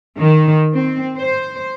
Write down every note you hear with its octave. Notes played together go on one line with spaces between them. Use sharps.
D#3
C4
C5